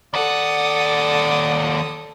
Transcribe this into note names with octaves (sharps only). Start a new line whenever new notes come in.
D#2 A4 D5 F#5 D#6